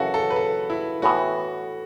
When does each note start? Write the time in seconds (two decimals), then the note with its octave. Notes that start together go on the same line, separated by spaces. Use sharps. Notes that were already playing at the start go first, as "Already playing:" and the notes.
Already playing: F#2 C#3 E3 F#4 A4
0.14 A4
0.30 B4
0.36 A4
0.70 E4
1.02 A2 E3 B3 F#4 A4